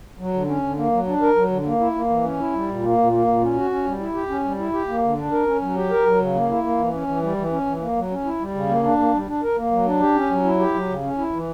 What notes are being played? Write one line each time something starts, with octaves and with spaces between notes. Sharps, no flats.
F#3
D3
C#4
D3
A#3
F#3
D4
A#4
F#3
D3
A#3
E4
A#3
E3
C#4
E4
G3
A#2
A#3
A#2
A#3
A#2
C#4
F#4
C#4
G3
E4
G4
C#4
G3
E4
G4
A#3
D3
D4
A#4
C#4
F#3
G4
A#4
F#3
C#3
A#3
E4
A#3
E3
C#4
E3
G3
E3
C#4
E3
A#3
F#3
C#4
E4
G3
C#3
A#3
D4
A#3
G3
D4
A#4
A#3
F#3
D4
G4
C#4
F#3
E4
G4
F#3
C#3
C#4
E4
E3